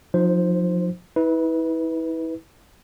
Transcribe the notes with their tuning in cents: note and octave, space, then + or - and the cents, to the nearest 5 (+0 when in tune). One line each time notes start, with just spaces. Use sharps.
F3 +35 D#4 +0 C5 +0
E4 -35 B4 +0